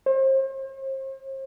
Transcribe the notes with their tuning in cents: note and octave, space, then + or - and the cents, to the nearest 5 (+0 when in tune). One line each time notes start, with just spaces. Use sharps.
C5 +40